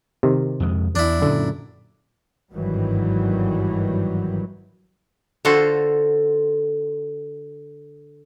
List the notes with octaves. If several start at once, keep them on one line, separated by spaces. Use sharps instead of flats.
C3 D#3
F2 G#3
E2 D4 E4
F#2 A#2 D3
G#1 G2 D#3 E3 F#3 G3
D3 F4 F#4 A4 C5